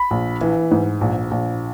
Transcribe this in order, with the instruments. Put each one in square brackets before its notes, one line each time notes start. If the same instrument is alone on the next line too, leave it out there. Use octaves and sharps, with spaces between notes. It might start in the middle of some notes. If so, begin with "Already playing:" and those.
Already playing: [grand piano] B5
[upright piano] A#1
E3
G#2
A#1
A#1